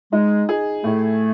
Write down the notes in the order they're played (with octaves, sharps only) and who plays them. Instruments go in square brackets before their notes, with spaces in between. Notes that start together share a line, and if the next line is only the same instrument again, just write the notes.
[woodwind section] G#3 [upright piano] D#4
[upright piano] G#4
[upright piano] A2 [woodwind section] A3